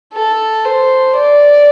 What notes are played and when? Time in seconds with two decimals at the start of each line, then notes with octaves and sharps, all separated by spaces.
0.13 A4
0.65 C5
1.16 D5